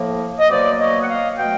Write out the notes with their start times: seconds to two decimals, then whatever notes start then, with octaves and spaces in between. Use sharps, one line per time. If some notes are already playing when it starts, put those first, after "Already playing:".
Already playing: A2 F3 A#3
0.39 D#5
0.50 B2 F#3 A#3 C5 D5
0.79 C#5 D#5
1.02 F#5
1.08 D#5 F5
1.37 B2 F#3 A3 F5 G5